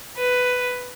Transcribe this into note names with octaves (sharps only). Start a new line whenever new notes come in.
B4